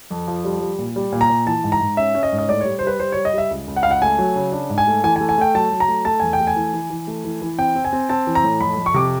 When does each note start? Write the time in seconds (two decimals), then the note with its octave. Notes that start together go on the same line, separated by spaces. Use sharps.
0.11 F2
0.28 F3
0.45 G3
0.61 G3
0.78 A#2
0.96 G3
1.12 A#2
1.21 A#5
1.30 A#2
1.46 E3 A5
1.64 G#2
1.72 A#5
1.81 G#2
1.97 C#4 E5
2.15 C#4
2.23 D#5
2.32 G#2
2.39 D#5
2.49 A2 D5
2.61 G3 C#5
2.79 C5
2.83 G3 B4
2.99 G3 C5
3.12 G3 C#5
3.25 D#5
3.33 G3 E5
3.51 C#2
3.68 C#2
3.76 F#5
3.83 C#2 F5
3.91 F#5
4.02 A3 G#5
4.19 F#3
4.36 C#3
4.52 D4
4.70 G#2
4.78 G#5
4.87 A3
5.04 E3 G#5
5.16 G#5
5.21 A3
5.29 G#5
5.38 A3 G5
5.55 F#3 A5
5.72 F#3
5.80 A#5
5.88 A3
6.05 A3 A5
6.20 E2 G#5
6.33 G5
6.40 A3
6.47 G#5
6.56 E3
6.74 E3
6.90 E3
7.07 A3
7.24 E3
7.42 E3
7.58 C4 G5
7.75 C4
7.85 G#5
7.93 C4
8.09 C4 A5
8.27 E3
8.35 A#5
8.43 A2
8.60 F2 B5
8.77 F2
8.86 C#6
8.94 C3 D6